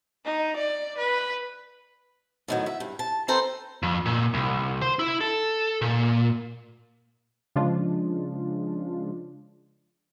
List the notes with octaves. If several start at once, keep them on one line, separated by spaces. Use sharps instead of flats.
D#4
D5
B4
A2 D#3 F#3
E5
G2
A5
C4 A4 B4 C5 G5 A#5
F2
A#2
C2
C5
E4
A4
A#2
C#3 F3 G#3 D4 F4